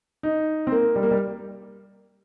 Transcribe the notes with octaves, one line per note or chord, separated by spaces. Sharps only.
D#4
C4
A#3
G3
A#3
G3